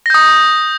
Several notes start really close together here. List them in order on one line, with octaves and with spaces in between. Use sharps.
A#6 G6 D#6